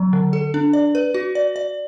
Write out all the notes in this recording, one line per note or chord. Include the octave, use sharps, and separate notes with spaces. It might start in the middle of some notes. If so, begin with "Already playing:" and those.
Already playing: F#3
D3
A4
D4
D5
B4
F#4
D5
D5